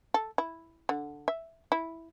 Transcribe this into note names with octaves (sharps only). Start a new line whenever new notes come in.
A4
E4
D3
E5
E4